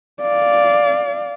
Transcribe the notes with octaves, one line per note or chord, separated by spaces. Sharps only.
D5 F5